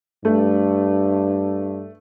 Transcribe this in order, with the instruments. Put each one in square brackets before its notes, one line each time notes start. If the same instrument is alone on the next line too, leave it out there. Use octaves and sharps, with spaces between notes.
[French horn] G2 [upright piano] A3